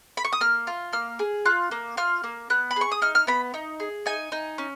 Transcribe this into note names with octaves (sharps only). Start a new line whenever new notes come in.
B5
C#6
D#6
A#3 F6
F4
A#3 F6
G#4
F4 F#6
A#3
F4 F6
A#3
B3 F#6
B5
G#4 C#6
D#6
D#4 F6
F6
B3 B5
D#4
G#4
D#4 G#5
D#4
C#4